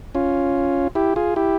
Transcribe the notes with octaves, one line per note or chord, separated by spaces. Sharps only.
C#4 F4
E4 G4
F4 G#4
E4 G4